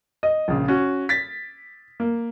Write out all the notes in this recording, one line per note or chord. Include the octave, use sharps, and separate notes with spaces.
D#5
A#1 C#3
C#4 F#4
A6 B6
A#3